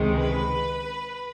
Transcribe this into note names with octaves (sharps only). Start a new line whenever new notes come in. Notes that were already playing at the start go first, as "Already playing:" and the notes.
Already playing: C#2 C3 D#3 G#3
B4